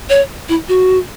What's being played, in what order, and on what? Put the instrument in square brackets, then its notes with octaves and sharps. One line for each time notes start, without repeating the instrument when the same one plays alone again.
[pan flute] C#5
E4
F#4